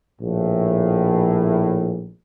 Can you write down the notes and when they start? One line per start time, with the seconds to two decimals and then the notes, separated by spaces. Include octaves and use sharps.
0.20 A#1 A2